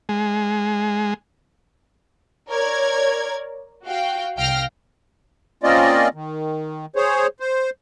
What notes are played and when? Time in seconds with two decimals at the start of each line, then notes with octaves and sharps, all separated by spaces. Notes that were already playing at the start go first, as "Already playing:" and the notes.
0.09 G#3
2.49 A#4 C#5 D5 G#6
3.84 F#4 F5 G5
4.37 C2 F5 G5 F6 A#6
5.63 A#3 C4 C#4 F4 D5 D#5
6.14 D#3
6.96 G#4 C5 C#5
7.40 C5